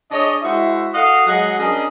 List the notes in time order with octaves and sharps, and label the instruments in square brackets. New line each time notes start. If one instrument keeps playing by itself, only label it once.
[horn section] D4 G#4 C#5 D#5
G#3 E4 F#4 C5 E5
F#4 A4 D#5 F5 F#5
F#3 G#3 G#4 D#5 F#5
C#4 D4 G#4 A#4 D#5 A5